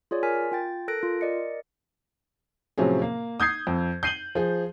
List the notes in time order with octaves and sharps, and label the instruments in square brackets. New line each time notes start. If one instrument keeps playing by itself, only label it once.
[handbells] F4 G#4 C#5 D5
A#4 G#5 F6 B6
F4 G5 A6
A4 A#4 F#6 A#6 D7
F4
A#4 D5 D#5 C#7
[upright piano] A2 C3 F3 F#3 C#4 G#4
A#3
D#6 G6 G#6 C7
F2
G6 C7 D#7 F#7 G7
F3 G#4